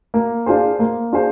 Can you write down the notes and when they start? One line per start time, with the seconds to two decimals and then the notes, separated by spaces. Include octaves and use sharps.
0.14 A#3
0.46 D4 F4 G#4 C5
0.80 A#3
1.12 D4 F4 G#4 C5